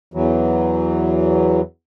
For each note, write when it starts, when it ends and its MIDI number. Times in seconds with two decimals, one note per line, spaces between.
0.14 1.61 40
0.14 1.61 52
0.14 1.61 54